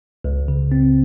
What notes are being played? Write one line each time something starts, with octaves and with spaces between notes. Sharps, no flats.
C#2
C#3
C4